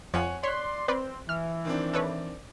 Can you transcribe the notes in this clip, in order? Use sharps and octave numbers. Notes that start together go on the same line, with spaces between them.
F2 F3 C#5 F#5 G#5
C#5 D5 C6 F#6 B6
C4 B4 D5 C6
E3 F6
D#3 C4 D4
A4 B4 C#5